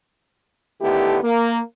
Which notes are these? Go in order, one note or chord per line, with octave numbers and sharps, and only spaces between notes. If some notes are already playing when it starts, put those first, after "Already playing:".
D3 D#3 A3 B3 E4 G4
A#3